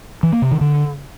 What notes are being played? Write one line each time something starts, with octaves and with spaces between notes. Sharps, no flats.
E3
A#3
C3
D#3
D3